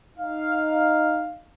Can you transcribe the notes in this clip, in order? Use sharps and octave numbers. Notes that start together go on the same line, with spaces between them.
D#4 F5